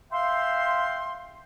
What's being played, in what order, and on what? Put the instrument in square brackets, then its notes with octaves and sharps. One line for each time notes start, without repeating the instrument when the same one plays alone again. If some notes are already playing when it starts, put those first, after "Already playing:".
[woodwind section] E5 F5 G5 C6